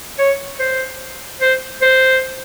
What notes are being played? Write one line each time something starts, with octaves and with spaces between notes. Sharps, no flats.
C#5
C5
C5
C5